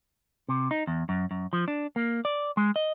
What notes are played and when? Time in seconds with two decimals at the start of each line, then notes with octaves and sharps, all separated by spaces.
0.49 C3
0.71 D#4
0.87 E2
1.09 F#2
1.31 F#2
1.53 F3
1.68 D4
1.96 A#3
2.25 D5
2.57 G#3
2.76 D#5